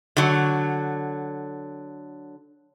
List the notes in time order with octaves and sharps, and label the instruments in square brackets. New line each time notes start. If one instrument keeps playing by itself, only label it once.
[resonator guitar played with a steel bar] D3 F#3